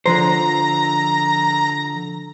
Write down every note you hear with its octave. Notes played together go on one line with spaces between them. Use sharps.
D3 F3 C5 A#5